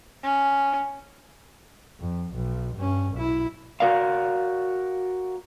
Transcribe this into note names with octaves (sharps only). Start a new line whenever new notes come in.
C#4
F2
B1
G2 C#4
B1 E4
F#4 A#4 D5 F5